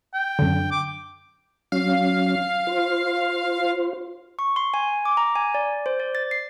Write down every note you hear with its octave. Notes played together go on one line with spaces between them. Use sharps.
G5
F#2 D3
D6
F#3 C#4 F5
F4 C5
C#6
C6
G#5
D6
A#5
G#5
D5
C5
D5
A6
C7